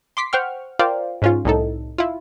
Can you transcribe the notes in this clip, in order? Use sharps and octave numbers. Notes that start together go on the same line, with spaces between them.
C6 D6 B6 C7
C5 F#5 G5 C#6 F6
F4 A#4 C5 D5 F5 G5
G#2 C#4 F4
C2 A2 D#4 A4
E4 F4